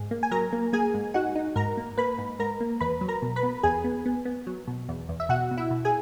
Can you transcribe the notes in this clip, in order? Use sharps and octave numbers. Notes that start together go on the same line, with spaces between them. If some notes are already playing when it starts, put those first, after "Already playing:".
Already playing: G#2 G#4
A#3
G#5
F#3 A#4 A#5
A#3
A#3 G#4 G#5
G#2
D#4 F#4 F#5
D#4
G#2 A#4 A#5
A#3
A#3 B4 B5
G#2
G#2 A#4 A#5
A#3
E2 B4 B5
F#3
A#4 A#5
B2
B4 B5
B3
E2 G#4 G#5
B3
B3
B3
F#3
B2
E2
E2
E5
B2 F#4 F#5
B2
E4 E5
B2
G#4 G#5